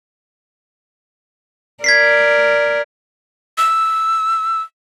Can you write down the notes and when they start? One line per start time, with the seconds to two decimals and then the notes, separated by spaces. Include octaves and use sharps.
1.84 A#4 D5 G#6 B6 C7
3.58 E6